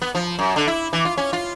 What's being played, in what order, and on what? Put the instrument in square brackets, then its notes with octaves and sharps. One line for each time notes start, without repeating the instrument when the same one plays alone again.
[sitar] B3
F3
F#2
D3
E4
E3
F4
C#4
F4